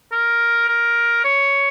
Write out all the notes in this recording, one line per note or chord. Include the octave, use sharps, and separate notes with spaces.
A#4
A#4
C#5